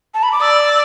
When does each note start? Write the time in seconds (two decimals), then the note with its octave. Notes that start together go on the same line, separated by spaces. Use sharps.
0.14 A5
0.23 B5
0.32 D6
0.41 D5 E6